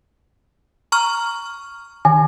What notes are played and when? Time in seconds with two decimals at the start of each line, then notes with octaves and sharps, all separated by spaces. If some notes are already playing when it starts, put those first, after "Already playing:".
0.92 A#5 C#6 F6
2.05 D#3 G#5